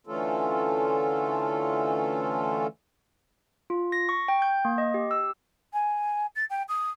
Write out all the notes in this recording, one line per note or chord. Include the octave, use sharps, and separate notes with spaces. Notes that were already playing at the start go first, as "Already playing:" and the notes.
D3 E3 A3 C#4 F4 A4
F4
A#6
C#6
G5
G6
A#3
D#5
G4
E6
G#5
A6
G5
D#6